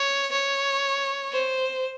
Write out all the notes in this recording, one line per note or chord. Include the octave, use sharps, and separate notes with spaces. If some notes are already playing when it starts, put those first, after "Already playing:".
Already playing: C#5
C#5
C5